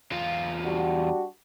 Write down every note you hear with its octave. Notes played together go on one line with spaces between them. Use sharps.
E2 F4
G3 D4 F#4